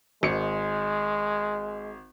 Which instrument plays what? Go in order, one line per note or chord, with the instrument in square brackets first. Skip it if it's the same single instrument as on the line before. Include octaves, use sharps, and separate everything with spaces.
[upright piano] G#1 C#7 [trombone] G#3